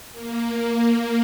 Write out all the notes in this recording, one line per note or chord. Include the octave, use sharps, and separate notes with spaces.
A#3
A#3